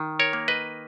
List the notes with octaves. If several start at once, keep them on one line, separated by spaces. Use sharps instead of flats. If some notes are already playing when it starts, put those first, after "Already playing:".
Already playing: D#3
A#4 C#5
A#3
B4 D#5